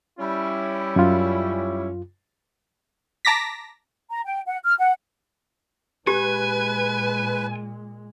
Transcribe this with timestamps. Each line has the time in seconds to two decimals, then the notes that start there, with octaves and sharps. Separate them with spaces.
0.19 G3 C#4 E4
0.96 F#2 F4
3.25 A5 A#5 D6 A#6 B6
4.10 A#5
4.25 G5
4.46 F#5
4.64 F6
4.79 F#5
6.07 A#2 G#3 G4 B4 G#5